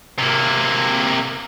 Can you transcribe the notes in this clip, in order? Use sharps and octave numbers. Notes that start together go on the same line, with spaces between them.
C3 A#3